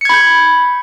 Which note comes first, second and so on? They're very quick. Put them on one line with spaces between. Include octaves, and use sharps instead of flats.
C#7 G#6 B5 G6